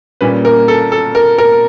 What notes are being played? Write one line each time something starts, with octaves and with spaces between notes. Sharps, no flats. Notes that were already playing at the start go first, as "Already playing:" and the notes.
A#2 G3 A#3 C#4 B4
A#4
A4
A4
A#4
A#4